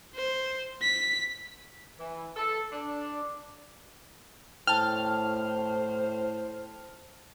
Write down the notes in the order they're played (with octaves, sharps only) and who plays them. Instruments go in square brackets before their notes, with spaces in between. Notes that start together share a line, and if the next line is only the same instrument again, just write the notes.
[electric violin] C5
B6
[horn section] E3
A4
D4
[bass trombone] A2 [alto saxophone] C5 [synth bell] G5 A5 [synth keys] F6